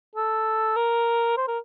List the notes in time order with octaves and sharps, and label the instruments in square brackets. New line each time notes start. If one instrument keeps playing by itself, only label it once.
[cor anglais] A4
A#4
C5
A#4